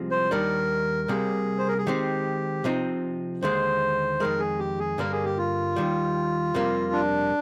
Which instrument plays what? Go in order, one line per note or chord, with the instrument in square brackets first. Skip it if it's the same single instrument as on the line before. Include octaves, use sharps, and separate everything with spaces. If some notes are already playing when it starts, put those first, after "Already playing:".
Already playing: [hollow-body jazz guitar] C2 C3 F3 G#3
[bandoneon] C5
[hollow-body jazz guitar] D#2 D#3 G3 D4 [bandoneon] A#4
[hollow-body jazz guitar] C2 C3 G3 A#3 [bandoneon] G#4
[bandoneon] C5
A#4
G#4
[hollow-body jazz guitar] D#3 G#3 C4 [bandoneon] G4
[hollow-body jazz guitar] C3 F3 C4 D#4
[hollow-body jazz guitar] D#2 D3 G#3 [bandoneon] C5
[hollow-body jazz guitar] F2 D#3 G#3 [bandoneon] A#4
[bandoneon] G#4
G4
G#4
[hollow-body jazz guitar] G2 D3 G3 A#3 [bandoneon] A#4
[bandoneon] G#4
G4
F4
[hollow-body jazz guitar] D#2 D#3 G3
F2 C3 G3 A#3
[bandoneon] D4